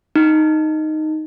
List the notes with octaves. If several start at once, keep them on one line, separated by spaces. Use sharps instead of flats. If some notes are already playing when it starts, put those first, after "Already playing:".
D#4